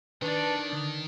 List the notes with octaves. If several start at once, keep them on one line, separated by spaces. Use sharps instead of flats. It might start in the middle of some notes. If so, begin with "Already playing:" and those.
D#3 D4 B4 D5 A5
D3